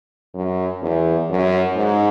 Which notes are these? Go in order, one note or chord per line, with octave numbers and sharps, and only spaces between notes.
F#2
E2
F#2
G#2